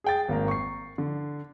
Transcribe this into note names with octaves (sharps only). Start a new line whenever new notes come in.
G#4 G5 A6
G#1 A#3 A#5
C#6 C7
D3